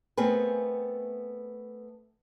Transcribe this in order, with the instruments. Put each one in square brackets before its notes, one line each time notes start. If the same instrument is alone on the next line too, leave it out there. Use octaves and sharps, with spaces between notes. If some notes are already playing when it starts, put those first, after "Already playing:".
[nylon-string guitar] A3 B3 C4 G#4 A#4 B4